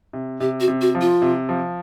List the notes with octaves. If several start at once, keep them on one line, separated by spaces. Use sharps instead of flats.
C3
C3 G4
F#4
C3
F#4
F3
F4
C3
F3